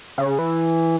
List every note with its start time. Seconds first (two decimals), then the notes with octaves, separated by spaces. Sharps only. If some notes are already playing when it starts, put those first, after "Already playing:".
0.18 C#3
0.39 E3